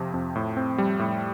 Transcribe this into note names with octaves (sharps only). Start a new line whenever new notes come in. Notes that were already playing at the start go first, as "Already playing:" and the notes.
Already playing: F2 C3 F3
F2
A2
C4
G3
A2